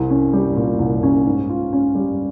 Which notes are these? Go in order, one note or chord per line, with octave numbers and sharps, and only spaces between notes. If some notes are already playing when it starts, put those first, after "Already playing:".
Already playing: C2
C#4
G3
A#2
C2
C#4
G#2
F4
C#4
G3